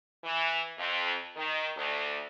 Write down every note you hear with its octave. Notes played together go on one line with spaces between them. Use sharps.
E3
F2
D#3
D2